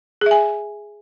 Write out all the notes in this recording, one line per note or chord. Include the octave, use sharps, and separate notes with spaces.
G#4 E5 G#5